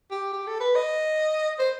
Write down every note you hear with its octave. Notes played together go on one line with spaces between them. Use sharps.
G4
G4
A4
B4
D#5
C5